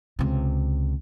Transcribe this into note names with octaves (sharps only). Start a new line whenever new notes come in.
C#2 C3